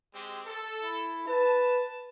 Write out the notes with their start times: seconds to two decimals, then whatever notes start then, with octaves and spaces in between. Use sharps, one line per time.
0.13 G#3 C4 G4
0.46 A4
0.81 E4
1.28 B4 A5